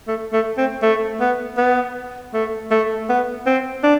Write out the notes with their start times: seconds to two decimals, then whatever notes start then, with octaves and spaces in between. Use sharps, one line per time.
0.08 A3
0.33 A3
0.58 C4
0.83 A3
1.20 B3
1.58 B3
2.34 A3
2.71 A3
3.09 B3
3.46 C4
3.83 D4